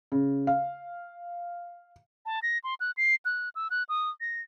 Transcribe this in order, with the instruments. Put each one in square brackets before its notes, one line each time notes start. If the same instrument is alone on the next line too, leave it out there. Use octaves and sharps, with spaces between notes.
[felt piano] C#3
F5
[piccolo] A5
A#6
C6
F#6
C7
F#6
E6
F#6
D#6
A#6